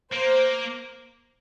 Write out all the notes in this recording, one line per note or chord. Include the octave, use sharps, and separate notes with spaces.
A#3 C5